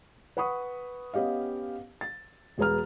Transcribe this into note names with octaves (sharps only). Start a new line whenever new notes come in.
B4 F#5 B5 C#6 D#6
B3 C#4 G4 D#5 F5
A6
E1 G#3 G#4 B4 A#5 F6